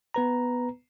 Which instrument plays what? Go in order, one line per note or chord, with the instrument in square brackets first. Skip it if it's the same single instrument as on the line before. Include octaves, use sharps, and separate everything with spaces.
[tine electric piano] B3 B4 A#5